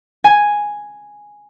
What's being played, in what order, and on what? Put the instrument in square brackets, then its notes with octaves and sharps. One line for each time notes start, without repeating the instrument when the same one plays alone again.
[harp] G#5